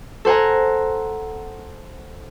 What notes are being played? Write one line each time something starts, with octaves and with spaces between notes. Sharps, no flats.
A4 C5 F#5 G#5 A#5